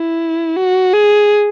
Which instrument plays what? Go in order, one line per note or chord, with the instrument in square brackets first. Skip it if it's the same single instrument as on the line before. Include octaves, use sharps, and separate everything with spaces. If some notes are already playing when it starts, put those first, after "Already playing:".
Already playing: [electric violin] E4
F#4
G#4